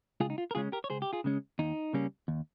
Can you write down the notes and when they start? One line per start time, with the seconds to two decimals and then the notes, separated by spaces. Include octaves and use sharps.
0.20 C#2 F4 G#4
0.30 D#4
0.38 F4
0.51 A#4
0.55 C#3 G#3 C#4 F4 G#4
0.72 G4 A#4
0.84 C#5
0.90 C#2 G#4 C5
1.02 G4
1.13 F4 G#4
1.24 C#3 G#3 C#4
1.59 D#2 D#4
1.93 C#3 G3 A#3 C#4
2.28 D#2